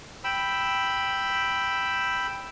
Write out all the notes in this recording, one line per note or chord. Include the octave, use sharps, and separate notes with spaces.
G5 B5 E6